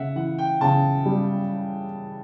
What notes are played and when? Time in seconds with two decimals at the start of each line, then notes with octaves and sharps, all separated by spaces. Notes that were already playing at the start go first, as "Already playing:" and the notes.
Already playing: C#3 E5 F#5
0.16 E3 F#5
0.38 G5
0.61 C#3 A5
1.06 G3